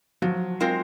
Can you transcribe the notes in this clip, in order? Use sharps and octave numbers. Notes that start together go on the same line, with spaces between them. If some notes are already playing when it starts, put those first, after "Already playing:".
F3 F#3
G#3 C4 F4 A#4